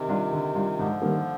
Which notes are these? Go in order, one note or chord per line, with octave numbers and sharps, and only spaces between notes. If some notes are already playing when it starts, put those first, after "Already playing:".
Already playing: C3 D#3
G3 D4 F4
D3
G3 D4 F4
G#2 D3 F3
D#3 G3 A#3